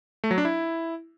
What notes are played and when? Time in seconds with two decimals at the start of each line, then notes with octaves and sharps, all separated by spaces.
0.24 A3
0.31 F#3
0.38 D4
0.45 E4